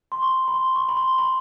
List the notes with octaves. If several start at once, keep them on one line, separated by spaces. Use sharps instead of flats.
C6
C#6
B5
C6
C#6
B5
C6
B5